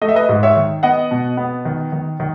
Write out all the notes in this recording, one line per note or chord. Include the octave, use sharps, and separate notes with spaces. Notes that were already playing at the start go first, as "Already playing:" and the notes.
A3 D#5
E5
B4 D#5
G#2
C#5 E5
D#3
B3 D#5 F#5
B2
B3
D#3
D#3
D#3